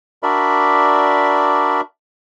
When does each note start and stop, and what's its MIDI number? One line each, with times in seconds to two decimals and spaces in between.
0.23 1.81 62
0.23 1.81 66
0.23 1.81 70
0.23 1.81 74
0.23 1.81 76
0.23 1.81 83